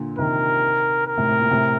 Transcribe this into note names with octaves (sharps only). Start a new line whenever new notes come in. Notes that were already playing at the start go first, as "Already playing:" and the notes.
Already playing: A#2 D3
C3 D#3 A#4
A#4
A2 C3
A2
A#2
A2 C3